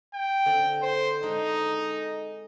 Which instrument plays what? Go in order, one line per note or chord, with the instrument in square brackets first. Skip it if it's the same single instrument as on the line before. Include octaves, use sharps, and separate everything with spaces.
[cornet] G5
[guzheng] D3 C4 D5
[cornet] C5
[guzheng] D3 G#3 D4 [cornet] D#4
[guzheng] D#5